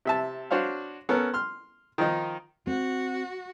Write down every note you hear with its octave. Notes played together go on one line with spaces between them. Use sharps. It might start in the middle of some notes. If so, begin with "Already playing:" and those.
C3 E5 A5
D4 F#4 C5 C#5 F5
B3 C#4 A4 A#4
C6 F6
D#3 F3 D#4
C4 F#4